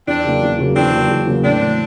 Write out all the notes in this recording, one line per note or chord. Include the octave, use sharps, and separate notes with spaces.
E2 C4 D4
C#3 F#3 A#3
E2
C#3 F#3 A#3
E2 C4 D4
C#3 F#3 A#3
E2
C#3 F#3 A#3
A2 C4 D4
E3 A3